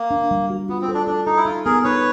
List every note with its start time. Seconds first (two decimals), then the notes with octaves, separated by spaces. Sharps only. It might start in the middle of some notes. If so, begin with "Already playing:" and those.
Already playing: A#3
0.11 D4
0.31 G3
0.50 F#4
0.69 B3 F4
0.81 C4
0.89 A4
0.94 D4
1.07 D4 A4
1.26 D#4 A4
1.37 E4
1.45 D#4 F4
1.65 B3 G#4 A#4
1.84 D#4 B4 C#5